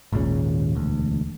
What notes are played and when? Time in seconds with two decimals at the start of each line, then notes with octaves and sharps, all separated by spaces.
0.13 G#1 D#2 A#2 C#3
0.75 E1 D2